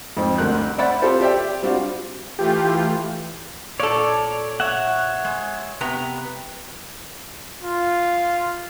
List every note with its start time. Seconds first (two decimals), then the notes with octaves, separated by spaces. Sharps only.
0.17 F2 G#2 C4
0.38 G1 D2 D3 A#4 F#6
0.78 C5 D5 E5 F#5 B5 A6
1.02 C4 F4 G4 A4 C5
1.21 G4 C5 D5 E5 G5
1.62 G3 C4 D4 F4 F#4
2.39 E3 A3 F4 G4
3.80 A#2 A4 C#5 D5
4.60 C#5 E5 F#5
5.25 G#3
5.81 C3 B3 A#5
7.61 F4